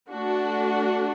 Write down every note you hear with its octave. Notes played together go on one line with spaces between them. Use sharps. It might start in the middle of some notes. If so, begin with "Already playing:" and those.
A3 D4 F#4